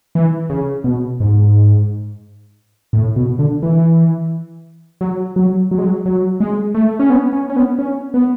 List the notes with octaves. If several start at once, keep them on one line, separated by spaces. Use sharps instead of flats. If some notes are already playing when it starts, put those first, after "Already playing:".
E3
C#3
B2
G#2
A2
B2
D3
E3
F#3
F#3
F#3
G#3
F#3
F#3
G#3
A3
C#4
B3
C#4
C#4
B3
C#4
B3